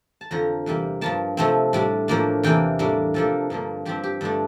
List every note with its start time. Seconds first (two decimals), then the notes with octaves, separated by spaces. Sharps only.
0.21 A5
0.31 F2 D3 F3 A#5
0.66 E2 C3 G3 A#3
1.01 G2 F3 A#3 A5
1.37 C3 F3 A3 C4
1.73 A2 G3 D4
2.08 A2 F3 A#3 D4
2.43 E2 C3 E3 A#3 D4 G5
2.79 A2 G3 A#3 D4
3.14 C3 F3 A#3 D4 A4
3.50 G2 D3 F3 A#3
3.85 G2 F3 C4 G4
4.03 G4
4.21 G2 D3 F3 A3 D4